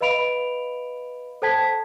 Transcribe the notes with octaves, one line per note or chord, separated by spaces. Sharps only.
B4 D#5 F5 B5 D7 F7
A4 C5 G5 A5 G#6 B6